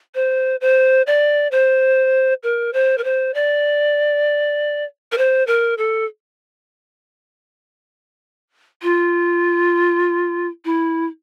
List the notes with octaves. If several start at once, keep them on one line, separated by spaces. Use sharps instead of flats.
C5
C5
D5
C5
A#4
C5
A#4
C5
D5
A#4
C5
A#4
A4
F4
E4